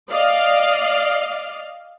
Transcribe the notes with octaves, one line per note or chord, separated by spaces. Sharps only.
D5 D#5 F5